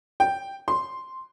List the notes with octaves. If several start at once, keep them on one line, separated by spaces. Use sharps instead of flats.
G5
C6